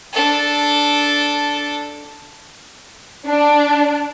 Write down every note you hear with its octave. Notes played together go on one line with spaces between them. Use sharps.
D4 A4
D4